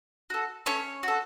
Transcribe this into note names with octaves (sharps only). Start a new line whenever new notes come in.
F#4 A4
A3 C#4 C#5
F#4 A4